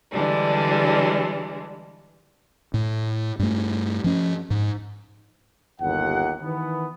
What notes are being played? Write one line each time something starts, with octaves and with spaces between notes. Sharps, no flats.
D3 E3 G3 G#3 D4
A2
G2 A3
F3 C#4
G#2
G1 D#2 F#5
D#3 E3 B3